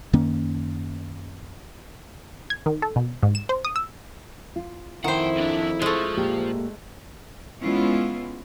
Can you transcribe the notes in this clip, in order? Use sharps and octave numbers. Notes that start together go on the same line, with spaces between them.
F#2 D#3 A#3 C#4
G#6
D#3
A4
B2
G#2
E7
C5
D#6
E6
F4
F2 D#3 E4 C5 F#5 G5
E2 D4
G#3 A3 F4 C5
A#2 A#3 G4
E3 G#3 B3 C#4 E4 F4